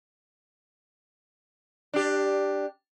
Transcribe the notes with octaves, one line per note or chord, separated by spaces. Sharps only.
D4 G4